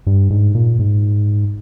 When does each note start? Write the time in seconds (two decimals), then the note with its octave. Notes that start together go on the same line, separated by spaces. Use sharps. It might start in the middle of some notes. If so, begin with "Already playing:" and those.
0.07 G2
0.30 G#2
0.55 A#2
0.79 G#2